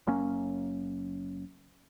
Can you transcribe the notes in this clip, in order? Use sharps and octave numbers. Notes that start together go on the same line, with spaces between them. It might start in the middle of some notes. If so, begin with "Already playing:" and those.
F#1 F#2 A#3 C#4